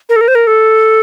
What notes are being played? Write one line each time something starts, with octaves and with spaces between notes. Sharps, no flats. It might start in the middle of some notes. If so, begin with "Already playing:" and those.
A#4
A4
A#4
C5
A#4
A4